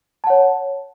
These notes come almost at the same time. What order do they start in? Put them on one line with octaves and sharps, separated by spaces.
A5 F#5 C#5